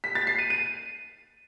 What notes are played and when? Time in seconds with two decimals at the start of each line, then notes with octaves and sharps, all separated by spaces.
0.04 B6
0.15 A6
0.27 C7
0.39 D#7
0.50 D#7